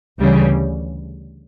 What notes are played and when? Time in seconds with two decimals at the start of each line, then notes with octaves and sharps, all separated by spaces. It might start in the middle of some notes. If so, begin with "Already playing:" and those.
0.19 D2 C#3 E3 G3